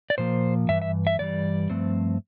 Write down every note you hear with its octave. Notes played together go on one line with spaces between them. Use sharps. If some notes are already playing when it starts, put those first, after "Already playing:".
D5
A#2 F3 A#3 C5
G2 E3 E5
E5
E5
G2 E3 G3 D5
G2 F3 A3 C4